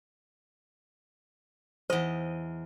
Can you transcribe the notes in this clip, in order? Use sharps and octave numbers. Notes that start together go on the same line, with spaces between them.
E2 C5 D#5